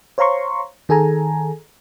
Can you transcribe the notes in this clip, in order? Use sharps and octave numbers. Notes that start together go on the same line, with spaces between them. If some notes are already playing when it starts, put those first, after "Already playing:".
C5 C#5 F5 A#5 C6 C#6
D#3 G#4 A4 G#5 A#5